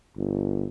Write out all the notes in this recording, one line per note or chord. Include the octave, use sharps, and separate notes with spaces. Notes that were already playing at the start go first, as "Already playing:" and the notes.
G1